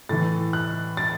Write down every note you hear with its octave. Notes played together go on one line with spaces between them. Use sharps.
A2 E3 A6
F#6
A6